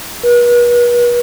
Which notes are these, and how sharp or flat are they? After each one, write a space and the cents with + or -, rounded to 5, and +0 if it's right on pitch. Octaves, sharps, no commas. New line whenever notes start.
B4 -40